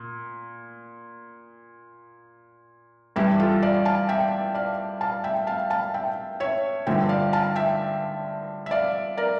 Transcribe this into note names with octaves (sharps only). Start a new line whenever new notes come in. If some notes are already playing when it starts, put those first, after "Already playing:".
Already playing: A#2
G2 E3 G3 E4 G4
F4 A4
D5 F5
F5 A5
E5 G5
D5 F5
F5 A5
E5 G5
F5 A5
F5 A5
E5 G5
C#5 E5
G2 D3 F3 E5 G5
D5 F5
F5 A5
E5 G5
E5
D5 F5
A#4 D5